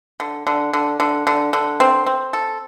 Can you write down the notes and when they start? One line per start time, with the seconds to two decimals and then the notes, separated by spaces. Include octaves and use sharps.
0.20 D3
0.47 D3
0.73 D3
1.00 D3
1.27 D3
1.53 D3
1.80 C4
2.06 C4
2.33 A4